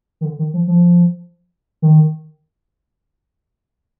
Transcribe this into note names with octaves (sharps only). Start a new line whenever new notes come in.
D#3
D3
D#3
F3
F3
D#3